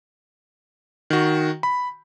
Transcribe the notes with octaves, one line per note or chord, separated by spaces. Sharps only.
D#3 F#4
B5